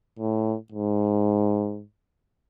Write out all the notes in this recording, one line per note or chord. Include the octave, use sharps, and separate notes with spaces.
A2
G#2